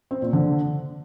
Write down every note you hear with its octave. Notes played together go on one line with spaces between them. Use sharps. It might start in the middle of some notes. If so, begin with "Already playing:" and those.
C4
A#2
D3